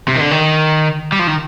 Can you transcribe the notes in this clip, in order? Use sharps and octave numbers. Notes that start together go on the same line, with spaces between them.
C3
D#3
D3
D#3
G3
F3
D#3